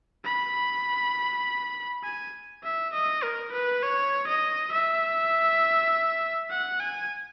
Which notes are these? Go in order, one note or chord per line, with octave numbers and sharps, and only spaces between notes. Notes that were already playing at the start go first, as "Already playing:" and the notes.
B5
G#5
E5
D#5
A#4
B4
C#5
D#5
E5
F#5
G#5